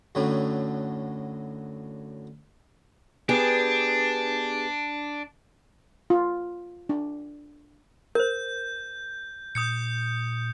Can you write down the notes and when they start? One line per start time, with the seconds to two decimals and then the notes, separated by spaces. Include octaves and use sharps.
0.15 F#2 A2 D3 F#3
3.29 B3 D4 G4 G#4
6.10 F4
6.89 D4
8.15 A#4 C5 G6
9.55 A#2 D#6 G6 C#7